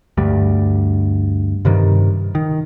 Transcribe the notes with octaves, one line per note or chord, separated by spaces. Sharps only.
D2 G2 G3
G2 C3 D#3 G3
D#3